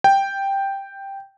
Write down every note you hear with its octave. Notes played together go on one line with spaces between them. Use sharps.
G5